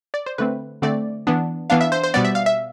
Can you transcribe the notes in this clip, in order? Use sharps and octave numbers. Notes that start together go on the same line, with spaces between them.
D5
C5
D3 A3 C4 B4
D3 A3 C4 D5
E3 B3 D4
E3 B3 D4 F5
E5
C5
C5
B2 G3 B3 D5
E5
F5
E5